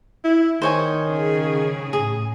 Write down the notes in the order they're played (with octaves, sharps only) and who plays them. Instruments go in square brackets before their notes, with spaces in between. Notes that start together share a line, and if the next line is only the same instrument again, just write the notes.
[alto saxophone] E4
[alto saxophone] D#3 [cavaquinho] C5 C#5 G#5
[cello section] C#3 C#4 G#4
[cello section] A2 [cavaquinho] G#4